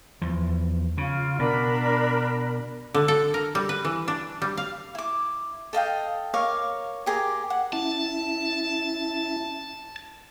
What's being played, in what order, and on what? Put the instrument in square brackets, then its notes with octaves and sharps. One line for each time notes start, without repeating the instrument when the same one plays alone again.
[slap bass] E2 F3
[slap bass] C#3 [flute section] F4
[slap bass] B2 [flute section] D4 A#4 B5
[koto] D3
A4
A#4
G3
B4
E3
D4
G3
F5
[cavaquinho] E4 D6
A4 D#5 F5 G5
A#4 C#5 F5 D6
G4 G#4 A#4 D6
F#5
[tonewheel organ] C#4 E4 E5 [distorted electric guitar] A5